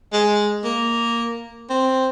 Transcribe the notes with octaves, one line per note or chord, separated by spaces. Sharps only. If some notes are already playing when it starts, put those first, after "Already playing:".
G#3
A#3
C4